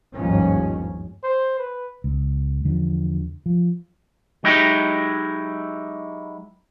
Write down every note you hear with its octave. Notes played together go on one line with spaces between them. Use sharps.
G1 D#2 G#2 D#3 F3 C#4
C5
B4
C#2
E2 D3 F3
F3
F#3 G#3 D#4 E4 G4